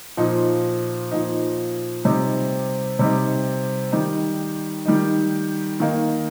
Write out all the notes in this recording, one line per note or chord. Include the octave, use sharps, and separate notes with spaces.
A#2 F3 D#4
A#2 F3 D#4
C3 G3 D#4
C3 G3 D#4
D#3 G3 D#4
D#3 G3 D#4
D#3 A#3 D#4